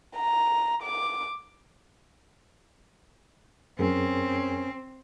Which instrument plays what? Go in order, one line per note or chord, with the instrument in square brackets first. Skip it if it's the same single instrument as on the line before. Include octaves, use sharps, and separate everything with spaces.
[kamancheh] A#5
D6
[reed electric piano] F#2 G#4 A#4 [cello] C4 [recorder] C#4